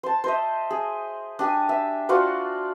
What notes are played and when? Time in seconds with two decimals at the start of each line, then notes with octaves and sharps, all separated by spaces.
0.03 C5 A5
0.24 C5 D#5 E5
0.70 G#4
1.39 D4 G4 G#5 D#6
1.69 E5
2.09 F4 F#4 C5 D5